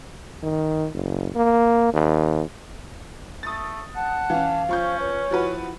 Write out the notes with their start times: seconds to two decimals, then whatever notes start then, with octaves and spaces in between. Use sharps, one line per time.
0.43 D#3
0.93 F#1
1.36 A#3
1.94 D#2
3.43 A3 D#6 A6
3.96 F#5 A5
4.30 E3 C#4 F5
4.69 F3 C#4 C5 C#6 G6
4.99 B4 C#5
5.31 F3 E4 F#4 B4